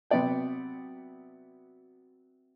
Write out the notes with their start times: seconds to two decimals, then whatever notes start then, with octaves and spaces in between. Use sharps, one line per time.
0.11 C3 F#3 B3 F#4 D5 G5